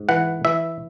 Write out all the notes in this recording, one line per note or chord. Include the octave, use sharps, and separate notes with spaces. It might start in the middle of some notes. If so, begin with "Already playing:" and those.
Already playing: G#2
E3 F#5
E3 E5